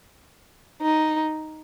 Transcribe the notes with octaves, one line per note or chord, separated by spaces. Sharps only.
D#4